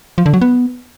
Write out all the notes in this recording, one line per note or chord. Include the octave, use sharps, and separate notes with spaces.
F3
D3
F#3
B3